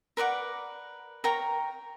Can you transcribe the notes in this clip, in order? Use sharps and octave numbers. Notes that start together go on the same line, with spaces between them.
A#4 B4 D5 F#5
A#4 C#5 G5 A#5